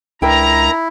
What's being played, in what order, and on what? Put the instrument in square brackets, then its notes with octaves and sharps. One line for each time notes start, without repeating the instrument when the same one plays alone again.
[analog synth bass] C#2 [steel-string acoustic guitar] D4 A#4 G5 [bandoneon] E4 [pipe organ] A#5